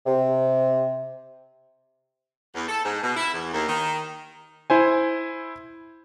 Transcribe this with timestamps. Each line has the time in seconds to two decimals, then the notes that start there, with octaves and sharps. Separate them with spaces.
0.06 C3
2.55 E2
2.68 A4
2.84 G#2
3.02 B2
3.16 E4
3.34 E2
3.53 D#2
3.68 D#3
4.70 E4 C5 G#5